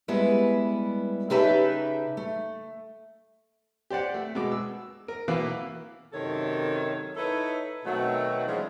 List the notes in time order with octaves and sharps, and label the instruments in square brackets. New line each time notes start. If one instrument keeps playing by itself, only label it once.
[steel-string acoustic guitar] G3 G#3 B3 E4 B4
C#3 D#4 G4 B4 E5 A5
A3
[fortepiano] G4 C5 D5 F#5
A3
B2 G#3 D6
E6
A#4
B2 E3 A#3 B4 F5 D6
[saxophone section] F#2 C3 D#3 A4 C#5
D#4 E4 A4 B4 C#5
B2 D#3 F#3 A3 C4
E3 F3 G#3 C#4 D4